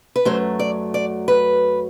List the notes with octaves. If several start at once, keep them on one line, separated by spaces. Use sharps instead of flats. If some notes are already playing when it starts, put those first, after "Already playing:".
B4
F#2 F#3 A3 C5
D5
D5
B4